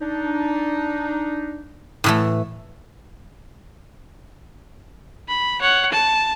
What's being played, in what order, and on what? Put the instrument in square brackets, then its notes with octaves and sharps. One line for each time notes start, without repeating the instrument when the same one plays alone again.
[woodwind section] D4 D#4
[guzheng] A2 E3 A3
[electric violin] B5
C#5 F#5
A5